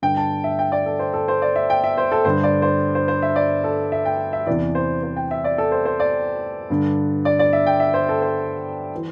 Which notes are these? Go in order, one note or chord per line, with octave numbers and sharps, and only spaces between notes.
G2 D3 G5
A5
E5
G5
D5
A4
C5
A4
C5
D5
E5
G5
E5
C5
A4
G2 D3 C5
D5
C5
C5
C5
E5
D5
A4
E5
G5
E5
E2 C3 E3 D5
C5
C5
G5
E5
D5
A4
C5
C5
D5
G2 D3
D5
D5
E5
G5
E5
C5
A4
C5
E3